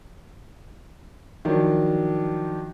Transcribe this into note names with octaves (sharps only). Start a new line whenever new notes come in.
D#3 F3 F#3 D4